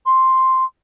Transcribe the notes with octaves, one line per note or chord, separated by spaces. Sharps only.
C6